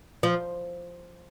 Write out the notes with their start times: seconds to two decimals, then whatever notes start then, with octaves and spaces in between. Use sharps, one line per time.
0.23 F3